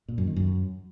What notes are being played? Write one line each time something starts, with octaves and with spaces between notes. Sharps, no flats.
A#2
F#2
D#3
F#2